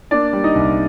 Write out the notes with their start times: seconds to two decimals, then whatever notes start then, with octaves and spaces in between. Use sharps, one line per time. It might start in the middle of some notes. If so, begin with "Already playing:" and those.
0.11 A#3 D4 D5
0.33 G3
0.44 D#4 D#5
0.55 C2